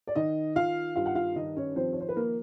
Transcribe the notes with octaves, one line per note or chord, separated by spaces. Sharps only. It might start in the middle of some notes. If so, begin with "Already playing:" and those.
D5
D#3 D#4 D#5
D#3 F4 F5
G2 F4 F5
F#5
F4 F5
D#3 D#4 D#5
C#4 C#5
F3 C4 C5
C#5
C5
B4
F3 A#3 A#4